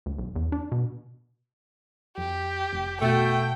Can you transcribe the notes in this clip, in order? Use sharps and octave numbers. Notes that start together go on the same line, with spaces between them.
D2
B1
E2
D4
B2
F2 G4
F1
B2 A3 F#4 G5